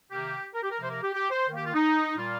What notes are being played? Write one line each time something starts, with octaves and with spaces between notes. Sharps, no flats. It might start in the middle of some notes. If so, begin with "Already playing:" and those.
C3 D#3 A#3 G4
A#4
G4
A#4
C3 F3 A#3 C5
A#4
G4
G4
C5
D#3 A#3
G4
F4
D#4
A#2 G3 A#3 F4